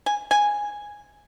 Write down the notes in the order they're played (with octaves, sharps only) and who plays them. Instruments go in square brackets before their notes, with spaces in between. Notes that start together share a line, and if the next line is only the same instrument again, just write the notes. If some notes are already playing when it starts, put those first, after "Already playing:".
[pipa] G#5
G#5